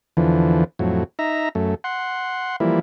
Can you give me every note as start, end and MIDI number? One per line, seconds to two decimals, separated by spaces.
0.17 0.64 40
0.17 0.64 50
0.17 0.64 52
0.17 0.64 53
0.79 1.04 41
0.79 1.04 45
0.79 1.04 54
1.19 1.49 63
1.19 1.49 76
1.19 1.49 82
1.55 1.75 42
1.55 1.75 57
1.84 2.56 78
1.84 2.56 84
2.60 2.79 52
2.60 2.79 53
2.60 2.79 55
2.60 2.79 58
2.60 2.79 64